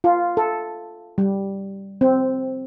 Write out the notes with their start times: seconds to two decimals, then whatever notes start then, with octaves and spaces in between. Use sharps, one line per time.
0.04 F4
0.37 A4
1.18 G3
2.01 C4